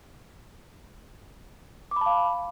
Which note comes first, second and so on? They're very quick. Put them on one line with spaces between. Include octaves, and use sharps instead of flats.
D6 B5 A5 F5